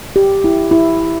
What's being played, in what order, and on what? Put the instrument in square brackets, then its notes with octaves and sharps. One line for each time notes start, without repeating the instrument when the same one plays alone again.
[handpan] G4
E4
E4